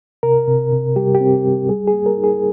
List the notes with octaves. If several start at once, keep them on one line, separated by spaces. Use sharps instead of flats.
C3 A#4
C3
C3
G3 G4
G4
C4
G3
G3 G#4
G#4
A#3
A#4
D#4
G#4